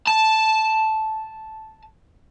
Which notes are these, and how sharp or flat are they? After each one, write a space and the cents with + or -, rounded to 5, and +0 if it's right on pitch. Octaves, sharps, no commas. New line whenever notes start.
A5 -5